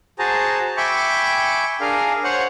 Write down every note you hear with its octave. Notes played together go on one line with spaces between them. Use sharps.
F#4 G#4 C5 A5 A#5
E5 G5 G#5 B5 C#6 D6
D4 G#4 A#4 F5
C5 C#5 F#5